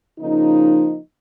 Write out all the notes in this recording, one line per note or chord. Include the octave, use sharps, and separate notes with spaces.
C#3 F3 A#3 D#4